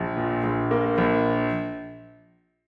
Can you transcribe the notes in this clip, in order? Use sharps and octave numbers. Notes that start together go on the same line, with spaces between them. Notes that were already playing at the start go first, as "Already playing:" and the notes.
Already playing: A#1
A#2
A#1
A#3
A#1